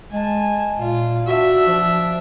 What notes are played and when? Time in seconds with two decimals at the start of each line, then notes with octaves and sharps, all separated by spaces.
0.12 G#3 G#5 A5
0.79 A#2 F4
1.27 D4 F#4 E5
1.67 F3